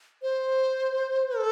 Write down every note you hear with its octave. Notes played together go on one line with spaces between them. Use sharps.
C5
A4